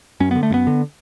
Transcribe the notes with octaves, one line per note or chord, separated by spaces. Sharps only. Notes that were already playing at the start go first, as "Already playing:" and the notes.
F#2 C#4
D3 B3
A3
F#2 B3
D3